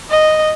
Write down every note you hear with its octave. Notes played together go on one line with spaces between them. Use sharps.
D#5